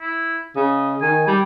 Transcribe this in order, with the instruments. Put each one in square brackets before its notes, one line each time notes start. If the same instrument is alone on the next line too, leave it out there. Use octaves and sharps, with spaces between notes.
[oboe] E4
[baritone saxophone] C#3 [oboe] D#5
[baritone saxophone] D#3 [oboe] G#5
[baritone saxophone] G3 [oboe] G5